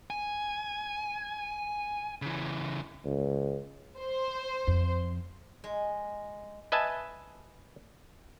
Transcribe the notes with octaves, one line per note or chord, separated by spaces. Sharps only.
G#5
C#3 E3
C#2
C5
F2
G#3
B4 D#5 E5 G#5 A5